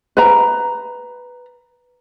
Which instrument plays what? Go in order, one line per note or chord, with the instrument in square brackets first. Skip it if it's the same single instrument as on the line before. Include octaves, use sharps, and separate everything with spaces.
[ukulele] B4 A#5